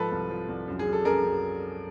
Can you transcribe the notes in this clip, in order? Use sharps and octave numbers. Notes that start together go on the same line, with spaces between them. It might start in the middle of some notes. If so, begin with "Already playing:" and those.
Already playing: G#2 F3 A4 B4
C2
F3
C2
F#2
G#4
F#2
A4
F#2 G#4 A#4
F#2